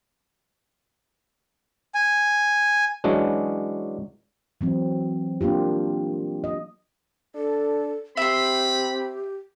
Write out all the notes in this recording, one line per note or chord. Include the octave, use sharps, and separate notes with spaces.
G#5
E3 F#3 G#3 C#4 D4
E3 F#3 C4
A#3 D4 F4 G4
D#5
D4 A4
C4 G4 E5 B5 C6